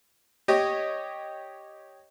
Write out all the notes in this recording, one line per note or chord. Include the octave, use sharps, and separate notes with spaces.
G4 C#5 D#5